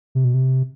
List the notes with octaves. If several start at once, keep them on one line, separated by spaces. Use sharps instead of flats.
C3
B2
C3